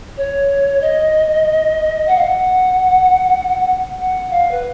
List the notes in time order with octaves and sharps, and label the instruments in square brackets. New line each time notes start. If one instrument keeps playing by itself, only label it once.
[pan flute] C#5
D#5
F#5
F5
F#5
F#5
F5
B4